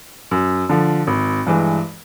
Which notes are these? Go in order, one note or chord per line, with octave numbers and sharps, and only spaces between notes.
F#2
D3 F3
G#1
G2 E3 G#3